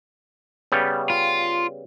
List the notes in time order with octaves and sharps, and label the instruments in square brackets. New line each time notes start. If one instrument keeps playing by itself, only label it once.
[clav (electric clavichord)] C#3 G3 B3
[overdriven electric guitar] F4